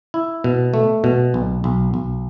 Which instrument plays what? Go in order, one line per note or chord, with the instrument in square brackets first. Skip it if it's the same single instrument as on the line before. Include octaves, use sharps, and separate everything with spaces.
[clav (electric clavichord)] E4
B2
A3
B2
B1
B1
B1